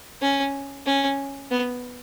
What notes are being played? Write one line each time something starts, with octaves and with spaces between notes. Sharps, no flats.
C#4
C#4
B3